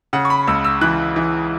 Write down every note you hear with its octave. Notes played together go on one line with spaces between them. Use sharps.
C#3 F#5
C#6
B5
C#2 E6
E6
E3 F#6
E3